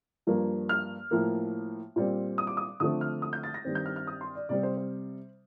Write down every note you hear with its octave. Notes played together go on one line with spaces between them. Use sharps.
G2 F3 A#3
F6
A2 F3 A#3
A#2 G3 C4
D#6
D6
D#6
D3 F3 A3 C4 D#6
F6
D#6
G6
A6
A#6
G2 D#3 G3 C4
G6
F6
F6
D#6
C6
D5
C3 G3 C4 D5
C5
C5